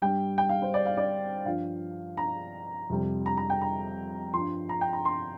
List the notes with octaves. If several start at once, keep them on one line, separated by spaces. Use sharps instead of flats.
G2 G3 G5
G5
F5
C5
D5
F5
D5
G2 F3 F5
A#5
F2 C3 G3
A#5
A#5
G5
A#5
G2 F3 C6
A#5
G5
A#5
C6